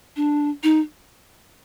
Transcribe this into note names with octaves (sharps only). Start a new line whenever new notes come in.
D4
D#4